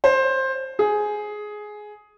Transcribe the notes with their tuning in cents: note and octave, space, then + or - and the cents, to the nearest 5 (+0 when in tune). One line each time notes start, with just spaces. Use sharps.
C5 +15
G#4 +10